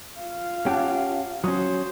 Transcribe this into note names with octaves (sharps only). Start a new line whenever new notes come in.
F4 F5
C#4 G4 F#5 A5
F#3 C#4 F#4 C5 D#6